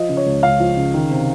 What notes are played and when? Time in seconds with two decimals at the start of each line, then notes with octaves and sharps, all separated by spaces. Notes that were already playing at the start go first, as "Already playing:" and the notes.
Already playing: F3 D#5
0.09 C#3
0.17 C#5
0.26 C#2
0.43 C#2 F5
0.60 F3
0.77 C#3
0.94 D#3
1.11 C3